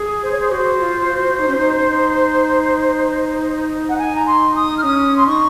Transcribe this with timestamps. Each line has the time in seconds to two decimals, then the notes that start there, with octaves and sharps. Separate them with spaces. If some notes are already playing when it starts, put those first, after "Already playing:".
Already playing: G#4
0.23 C5
0.31 C#5
0.40 C5
0.51 F#4 C5
0.80 F4
1.10 F#4
1.39 D#4
1.48 C#4
1.57 D#4
3.89 F#5
3.98 G#5
4.16 A#5
4.26 C6
4.55 D#6
4.78 F6
4.83 C#4 D#6
5.17 C6
5.27 D#4 C#6